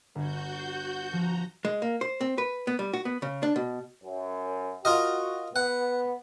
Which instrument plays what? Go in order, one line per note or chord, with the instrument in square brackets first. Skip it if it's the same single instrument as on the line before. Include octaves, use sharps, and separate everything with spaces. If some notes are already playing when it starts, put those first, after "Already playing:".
[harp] G1 G#6 [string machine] F#4 G6
[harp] C7
[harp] F3 [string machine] A#5
[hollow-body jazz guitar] G#3
A#3
C5
C4
B4
B3
G3
F#4
B3
C#3
D4
B2
[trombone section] F#2
[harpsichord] F4 A#4 D#5 [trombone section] F#4
[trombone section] B3 [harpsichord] F#5